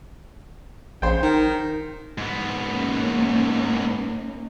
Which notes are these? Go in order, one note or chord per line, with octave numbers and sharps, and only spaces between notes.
A#1 C#3 C5 G5
D#3 D#4
G#2 B3
A#3 C#4 D#4